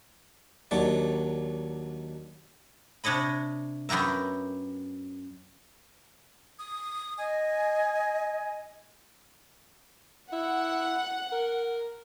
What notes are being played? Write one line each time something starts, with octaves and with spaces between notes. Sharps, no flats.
D#2 F#3 D4 D5
C3 D4 C#5 D#5 B5
F#2 B3 G4 A#4 E5
D#6
D#5 G#5
E4 F#5
A#4